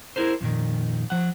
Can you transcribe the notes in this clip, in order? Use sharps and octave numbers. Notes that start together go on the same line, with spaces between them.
E4 G#4 A#4 C5
F2 A#2 D#3
F3 F#5